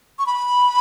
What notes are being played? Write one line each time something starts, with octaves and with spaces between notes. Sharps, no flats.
C#6
B5